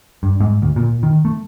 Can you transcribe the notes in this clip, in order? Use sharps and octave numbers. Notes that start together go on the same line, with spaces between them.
G2
G#2
D2
A#2
D#3
A3